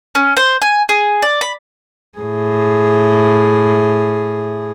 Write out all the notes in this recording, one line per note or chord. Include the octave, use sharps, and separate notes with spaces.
C#4
C5
G#5
G#4
D5
B5
A2 G#4